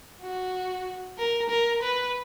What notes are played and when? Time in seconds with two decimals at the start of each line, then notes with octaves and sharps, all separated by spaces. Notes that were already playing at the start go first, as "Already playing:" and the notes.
0.22 F#4
1.19 A#4
1.50 A#4
1.83 B4